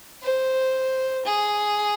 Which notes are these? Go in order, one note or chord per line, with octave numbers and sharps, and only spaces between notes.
C5
G#4